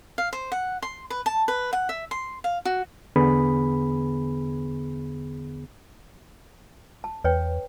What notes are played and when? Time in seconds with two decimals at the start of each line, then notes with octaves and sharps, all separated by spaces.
0.18 F5
0.33 C5
0.52 F#5
0.82 C6
1.10 B4
1.26 A5
1.48 B4
1.73 F#5
1.89 E5
2.11 C6
2.44 F5
2.65 F#4
3.16 E2 D3 B3 G#4 B5
7.04 A5
7.24 E2 B4 C#5 G5